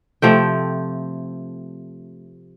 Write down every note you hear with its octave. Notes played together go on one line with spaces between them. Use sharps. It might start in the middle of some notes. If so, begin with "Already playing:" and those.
C3 F3 A3 G5